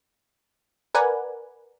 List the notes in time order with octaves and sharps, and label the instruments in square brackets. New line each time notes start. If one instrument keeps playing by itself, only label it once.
[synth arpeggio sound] A#4 B4 D5 F#5 G#5